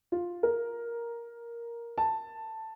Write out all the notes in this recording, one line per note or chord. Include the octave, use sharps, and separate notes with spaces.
F4
A#4
A5